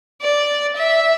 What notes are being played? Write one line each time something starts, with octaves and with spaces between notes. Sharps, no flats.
D5
E5